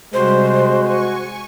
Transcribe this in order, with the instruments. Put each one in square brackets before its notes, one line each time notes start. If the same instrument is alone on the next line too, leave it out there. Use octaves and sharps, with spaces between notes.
[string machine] C3 G3 [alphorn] G#3 [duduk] F#4 [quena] C5
[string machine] G#5 C#6